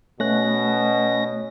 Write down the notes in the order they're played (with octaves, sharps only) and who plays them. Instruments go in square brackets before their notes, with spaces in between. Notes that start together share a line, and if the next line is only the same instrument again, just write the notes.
[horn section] B2 [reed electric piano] A3 F#6 [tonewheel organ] C#4 A#6